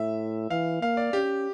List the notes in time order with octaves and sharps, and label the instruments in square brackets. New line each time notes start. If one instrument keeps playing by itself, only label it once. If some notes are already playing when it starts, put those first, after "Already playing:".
Already playing: [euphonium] A2 [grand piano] E5
[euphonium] E3 [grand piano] F5
[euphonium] A#3 [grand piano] F5
[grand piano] D5
[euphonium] C#4 [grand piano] G4